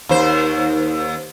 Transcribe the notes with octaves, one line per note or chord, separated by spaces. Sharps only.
D#2 C5